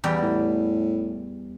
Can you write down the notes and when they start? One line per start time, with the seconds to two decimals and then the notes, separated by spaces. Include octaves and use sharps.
0.04 E2 G3 G5
0.23 A2